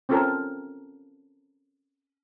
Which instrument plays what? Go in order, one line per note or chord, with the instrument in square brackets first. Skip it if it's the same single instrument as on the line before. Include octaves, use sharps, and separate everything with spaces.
[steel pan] C4 C#4 F4 A4 A#4 A5